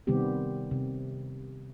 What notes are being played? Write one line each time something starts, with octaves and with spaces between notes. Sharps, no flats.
C3 D#3 G3 B3 C4 G4
C3